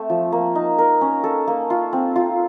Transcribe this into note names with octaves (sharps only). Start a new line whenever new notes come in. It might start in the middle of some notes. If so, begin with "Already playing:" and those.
Already playing: A3 C4
F3
A#3
D#4
A#4
C#4
A4
A#3
F4
C4
F4